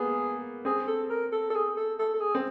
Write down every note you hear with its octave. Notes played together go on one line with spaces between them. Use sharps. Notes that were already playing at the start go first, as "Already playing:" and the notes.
Already playing: A#3 B3 G#4
C4 G#4
A4
A#4
A4
A4
G#4
A4
A4
A4
G#4
C4